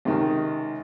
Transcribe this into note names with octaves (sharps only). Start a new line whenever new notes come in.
C#2 C3 D#3